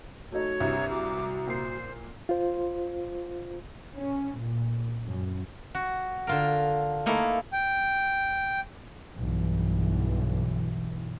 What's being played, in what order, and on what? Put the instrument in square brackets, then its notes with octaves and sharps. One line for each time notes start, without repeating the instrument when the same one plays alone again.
[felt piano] A3 D#4 [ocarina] F#4 [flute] C#5
[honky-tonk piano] C2 [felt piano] G2 C3
[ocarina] F#4 [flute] D6
[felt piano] A#2 C7 [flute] C5
[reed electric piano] F4 C5
[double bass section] C#4
A#2
F#2
[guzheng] F#4
D3 F4 A#4
A3 A#3 D#4 E4 A4
[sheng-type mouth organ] G5
[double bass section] B1 G2 E3